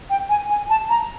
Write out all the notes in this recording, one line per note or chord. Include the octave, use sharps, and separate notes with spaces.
G5
G#5
G#5
A5
A#5